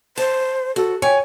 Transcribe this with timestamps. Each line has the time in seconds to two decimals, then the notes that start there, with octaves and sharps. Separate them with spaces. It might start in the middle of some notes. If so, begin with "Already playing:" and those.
0.17 C5 A5
0.76 F#4 A4
1.02 C#5 G5 G#5